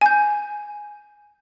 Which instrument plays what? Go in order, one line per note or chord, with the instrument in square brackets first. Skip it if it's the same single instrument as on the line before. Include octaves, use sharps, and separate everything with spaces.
[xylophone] G#5 G6